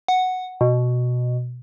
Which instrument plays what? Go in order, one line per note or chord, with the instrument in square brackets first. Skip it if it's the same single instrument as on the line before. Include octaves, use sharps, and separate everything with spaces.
[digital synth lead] F#5
B2